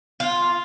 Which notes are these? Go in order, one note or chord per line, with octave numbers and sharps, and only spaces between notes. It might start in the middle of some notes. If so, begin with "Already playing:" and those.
F4